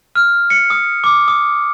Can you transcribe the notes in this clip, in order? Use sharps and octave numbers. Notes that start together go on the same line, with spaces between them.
F6
C#7
D#6
D6
D#6